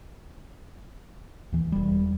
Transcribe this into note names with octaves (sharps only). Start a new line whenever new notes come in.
D#2 E3
E1 G3